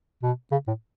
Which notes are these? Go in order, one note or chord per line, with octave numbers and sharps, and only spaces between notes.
B2
C#3
A2